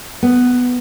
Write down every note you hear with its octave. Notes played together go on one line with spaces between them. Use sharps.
B3